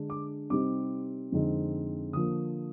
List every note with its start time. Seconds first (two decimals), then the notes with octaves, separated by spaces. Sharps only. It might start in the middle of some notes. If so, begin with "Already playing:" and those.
Already playing: D3 G#3 D4
0.10 D6
0.50 C3 G3 C4 D#4 D6
1.32 F2 D3 G#3 C4 D#4
2.13 D3 F3 A#3 D#6